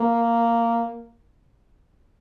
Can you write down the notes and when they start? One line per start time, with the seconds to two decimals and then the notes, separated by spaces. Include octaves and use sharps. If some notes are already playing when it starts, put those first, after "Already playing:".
Already playing: A#3